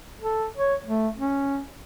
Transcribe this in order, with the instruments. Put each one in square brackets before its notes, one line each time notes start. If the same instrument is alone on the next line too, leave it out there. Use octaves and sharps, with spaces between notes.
[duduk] A4
C#5
A3
C#4